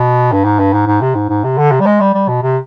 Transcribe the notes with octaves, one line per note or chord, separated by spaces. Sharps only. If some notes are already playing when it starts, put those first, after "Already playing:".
Already playing: B2
G2
G#2
G2
G#2
G#2
C3
G#2
G#2
C3
D3
C3
G3
G#3
G3
G3
B2
C3